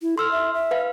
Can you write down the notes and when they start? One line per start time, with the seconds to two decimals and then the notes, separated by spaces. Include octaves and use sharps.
0.02 E4
0.18 A4 C6 E6 F6
0.31 E5
0.54 E5
0.71 B4 F5